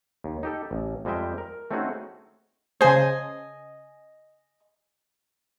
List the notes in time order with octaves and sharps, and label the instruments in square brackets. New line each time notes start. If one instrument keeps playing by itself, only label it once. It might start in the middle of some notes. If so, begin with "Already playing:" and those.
[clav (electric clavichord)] D#2
D#4 G4 A4
A1
F2 G3 G#3 D#5 E5 G5
A#4
A3 C4 C#4 D#4 F#4 G#4
[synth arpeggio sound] C#3 C5 [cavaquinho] D#5 G#5